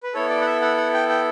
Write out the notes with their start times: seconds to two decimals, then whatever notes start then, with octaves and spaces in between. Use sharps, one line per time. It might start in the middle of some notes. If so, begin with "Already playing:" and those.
0.03 B4
0.14 B3 E4 A4 C#5
0.29 D5
0.41 F#5
0.46 E5
0.62 F#5
0.77 F#5
0.93 G5
1.09 G5